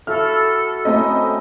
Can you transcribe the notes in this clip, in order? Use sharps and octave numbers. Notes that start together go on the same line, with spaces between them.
E4 F#4 A4 E5 F6
A3 C4 C#4 E4 A#4 D#5